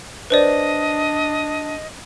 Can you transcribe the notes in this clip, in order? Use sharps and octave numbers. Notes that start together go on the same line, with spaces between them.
D4 B4 C5 D5 D#5